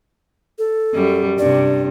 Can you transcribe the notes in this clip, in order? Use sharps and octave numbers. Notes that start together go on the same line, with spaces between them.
A4
F#2 G3
G2 C3 D5